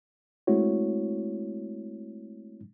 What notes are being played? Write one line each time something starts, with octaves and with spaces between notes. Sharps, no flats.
G#3 A3 C4 E4 F#4 C#5